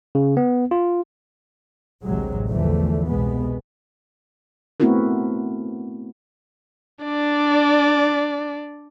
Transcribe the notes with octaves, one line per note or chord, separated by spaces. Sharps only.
C#3
B3
F4
A1 D2 C3 F#3 G#3
B1 E2 D3 E3 F3 A3
C2 B2 G#3 B3
A3 B3 C4 E4 F#4 A#4
D4 D5